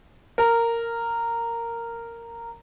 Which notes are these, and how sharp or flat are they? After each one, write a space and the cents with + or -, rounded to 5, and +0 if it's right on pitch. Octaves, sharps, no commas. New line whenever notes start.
A#4 -10